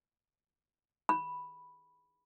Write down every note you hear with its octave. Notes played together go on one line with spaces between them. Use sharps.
B5